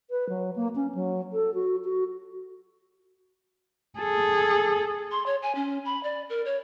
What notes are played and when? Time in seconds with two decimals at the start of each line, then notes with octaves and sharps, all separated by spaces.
0.10 B4
0.29 F#3
0.56 A#3
0.76 C#4
0.95 F#3
1.33 A4
1.54 F#4
1.85 F#4
3.99 G#4 A4
5.11 C6
5.26 C#5
5.42 G#5
5.55 C#4
5.85 B5
6.03 D5
6.30 A#4
6.45 C#5